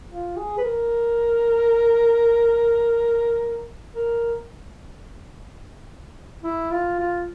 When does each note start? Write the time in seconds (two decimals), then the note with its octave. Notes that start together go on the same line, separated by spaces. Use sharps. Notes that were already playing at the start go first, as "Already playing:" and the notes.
0.10 F4
0.37 G#4
0.58 B4
0.64 A#4
3.95 A#4
6.43 E4
6.71 F4
6.99 F4